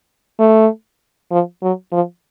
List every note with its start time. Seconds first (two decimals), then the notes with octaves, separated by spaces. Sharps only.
0.40 A3
1.31 F3
1.62 F#3
1.92 F3